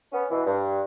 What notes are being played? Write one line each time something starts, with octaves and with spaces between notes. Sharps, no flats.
B3 C#4
B2 E3
G2